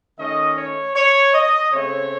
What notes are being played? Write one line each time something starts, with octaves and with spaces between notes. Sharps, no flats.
D#3 A3 C#4 D#5
C#5
C#5
D#5
C#3 A3 C4 C#5